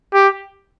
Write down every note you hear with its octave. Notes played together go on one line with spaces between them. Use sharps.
G4